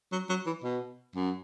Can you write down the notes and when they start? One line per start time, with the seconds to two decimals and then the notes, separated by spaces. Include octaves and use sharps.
0.12 F#3
0.29 F#3
0.46 E3
0.64 B2
1.15 F#2